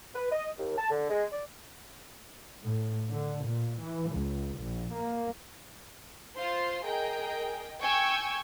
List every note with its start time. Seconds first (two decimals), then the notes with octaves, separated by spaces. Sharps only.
0.14 B4
0.31 D#5
0.58 D#2
0.77 A5
0.90 D3
1.10 G#3
1.32 D5
2.65 A2
3.10 D3
3.45 A#2
3.79 E3
4.11 C#2
4.58 A#1
4.92 A#3
6.36 F4 C5 C6
6.84 G#4 A#4 D#5 G5
7.81 G5 G#5 C#6 E6 G6 G#6